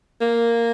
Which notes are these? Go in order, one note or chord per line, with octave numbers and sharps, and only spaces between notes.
A#3